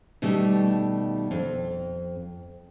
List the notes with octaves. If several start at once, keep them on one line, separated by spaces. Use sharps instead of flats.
B2 D#3 G3 A3
F2